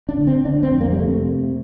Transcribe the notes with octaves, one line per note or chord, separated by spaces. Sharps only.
D4
D3
C4
D3 D4
C4
F2
A#3
G3
C3 A3